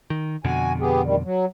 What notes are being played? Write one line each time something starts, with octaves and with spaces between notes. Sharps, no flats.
D#3
F2 B2 D3 F#4 G#5
B3 G4 G#4
D2 D#3 G3
F#3